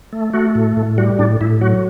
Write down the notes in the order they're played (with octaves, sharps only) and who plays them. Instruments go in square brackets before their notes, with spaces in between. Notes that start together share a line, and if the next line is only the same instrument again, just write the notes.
[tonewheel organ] A3
A3 F#4
A2
A2
G3 F#4
A2 D4
A2 E4
F#3 F#4